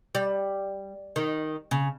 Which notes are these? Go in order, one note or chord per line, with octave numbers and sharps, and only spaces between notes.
G3
D#3
C#3